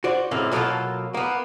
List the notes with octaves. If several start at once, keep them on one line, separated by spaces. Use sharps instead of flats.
F#4 C5 D5
C#2 A2 C3 A#3
B2 F#3 A#3 C4 F4 A4
A#3 B3